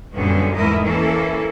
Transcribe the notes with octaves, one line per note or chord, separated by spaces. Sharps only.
F#2 A#2 D3 G3 B3 C#4
E2 G#2 A3 E4 A#4 D#5
E3 A#3 C#4 E4 A4